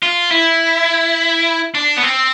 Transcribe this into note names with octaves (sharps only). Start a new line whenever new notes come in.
F4
E4
D4
B3
C4